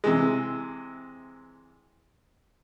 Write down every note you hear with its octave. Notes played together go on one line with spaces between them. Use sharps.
C3 E3 G#3